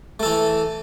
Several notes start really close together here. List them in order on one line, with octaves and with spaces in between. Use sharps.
A3 A4 E3